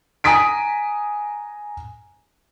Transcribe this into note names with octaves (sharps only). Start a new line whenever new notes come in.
G#5 A#5 D#6 B6 D7